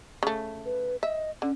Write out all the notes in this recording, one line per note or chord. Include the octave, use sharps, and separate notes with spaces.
C#3 A3
B4
D#5 E5
D3 C#4